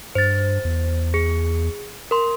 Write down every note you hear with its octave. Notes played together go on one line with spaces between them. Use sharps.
G2 C5 A6
E2
G#4 C#7
A#4 C6